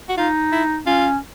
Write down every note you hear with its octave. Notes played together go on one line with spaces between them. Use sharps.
F#4
D#4 F4
E4
C#4 F4